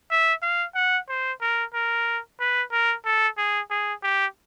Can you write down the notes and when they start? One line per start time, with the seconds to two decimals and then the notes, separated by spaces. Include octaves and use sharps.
0.11 E5
0.42 F5
0.75 F#5
1.09 C5
1.41 A#4
1.74 A#4
2.40 B4
2.72 A#4
3.05 A4
3.38 G#4
3.70 G#4
4.03 G4